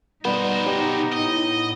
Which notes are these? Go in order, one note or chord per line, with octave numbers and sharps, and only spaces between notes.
B2 G3 B3 D#4 C5
G4 D#6
A2 D#5